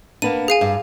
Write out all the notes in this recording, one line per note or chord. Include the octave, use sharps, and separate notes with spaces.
A#3 B3 D4 D#7
G#4 F5 G#5
G2